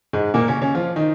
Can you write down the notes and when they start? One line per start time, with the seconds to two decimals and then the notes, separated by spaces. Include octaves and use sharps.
0.13 G#2 G#3
0.34 A#2 A#3
0.48 C#3 C#4
0.62 C#3 C#4
0.75 F3 F4
0.96 D#3 D#4